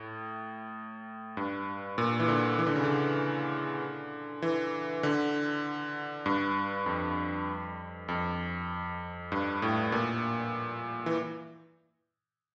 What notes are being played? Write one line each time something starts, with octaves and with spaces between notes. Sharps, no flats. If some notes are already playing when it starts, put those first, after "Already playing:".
Already playing: A2
G2
A#2
E3
D3
E3
D3
C#3
D3
E3
D3
G2
F2
F2
G2
A2
A#2
E3